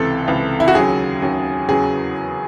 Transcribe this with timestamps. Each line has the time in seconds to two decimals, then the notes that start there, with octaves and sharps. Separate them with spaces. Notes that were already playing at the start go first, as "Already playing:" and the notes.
Already playing: C#2 C3 E3 A4
0.28 C#2 C3 E3
0.60 E4
0.68 F#4
0.75 D#2 C#3 F#3 G#4
1.22 D#2 C#3 F#3
1.68 E2 C#3 F#3 G#4